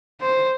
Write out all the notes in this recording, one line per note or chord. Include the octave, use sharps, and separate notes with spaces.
C5